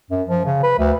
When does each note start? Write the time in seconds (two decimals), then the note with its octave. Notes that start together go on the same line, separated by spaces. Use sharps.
0.10 F#2
0.28 F3
0.46 C#3
0.63 B4
0.79 D2